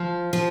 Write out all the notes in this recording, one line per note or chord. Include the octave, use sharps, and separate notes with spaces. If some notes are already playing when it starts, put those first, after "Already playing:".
Already playing: F3
F3